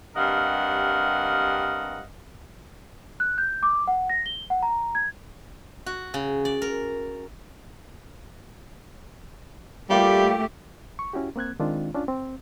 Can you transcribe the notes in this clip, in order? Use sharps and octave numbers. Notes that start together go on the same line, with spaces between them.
G2 C3 A#4 D#5 F5 F#5
F#6
G6
D6
F#5
A#6
G7
F#5
A#5
G#6
F#4
C#3
D5
A#4
G3 A3 A#3 F4 G4 D6
C#6
C#4 E4 F#4 G4
A#3 C4 F#6 G#6
D#3 G#3 C4 D4 F4
C#4 D4 F4
C4